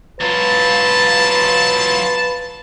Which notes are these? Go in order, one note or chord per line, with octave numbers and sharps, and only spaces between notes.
F#3 F4 B4 A5